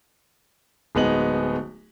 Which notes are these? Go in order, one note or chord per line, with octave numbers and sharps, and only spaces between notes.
D1 G#3 B3 D#4 F#7